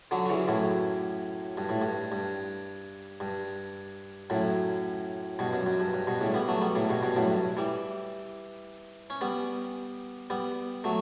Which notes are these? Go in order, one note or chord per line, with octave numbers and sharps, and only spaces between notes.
D3 F#3
F#3
C#3 E3
F#2 A2
G2
A2
G2
G2
G2
F#2 A2
G2 B2
F#2
F#2
G2
G2
G2 B2
A2 C#3
G3 B3
F#3 A3
G3 B3
A2 C#3
G2 B2
G2 B2
F#2 A2
G2
E3 G3
C#4
G3 B3
G3 B3
F#3 A3